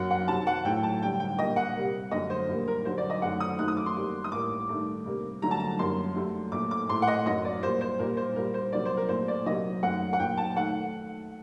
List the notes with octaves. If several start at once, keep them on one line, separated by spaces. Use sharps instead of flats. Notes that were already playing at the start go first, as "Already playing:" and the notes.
Already playing: F#2 F#3 A#3 F#5
F#5
C3 D#3 F#3 A5
F#5
A2 F#3 A3 G5
A5
G2 D3 G3 G5
G5
A#2 G3 A#3 D#5
F#5
C3 G3 A#3
F#2 D3 A3 D#5
C5
A#2 G3 A#3
A#4
G2 D3 F#3 C5
D5
D#5
F#2 D#3 A3 F#5
D#6
F#2 D#3 A3 F#6
D#6
D6
C6
G2 D#3 G3 A#3
D#6
A2 G3 A#3 D6
G2 D#3 A3
C3 G3 A#3
G2 D3 F#3 A3 A#5
A5
A#5
F#2 D#3 G3 A#3 C6
G2 F#3 A3
A#2 A3 D6
D6
A2 A3 C6
F#5
D#5
F#2 F#3 A#3 D#5
D5
A#2 G3 A#3 C5
C5
A#2 G3 A#3 A#4
C5
A#2 G3 A#3 A#4
C5
C3 F#3 A#3 D5
C5
A#4
A#2 A3 C5
D5
C3 F#3 A#3 D#5
F#2 D#3 A3 F#5
F#5
A#2 F#3 A#3 G5
A5
D#3 A3 F#5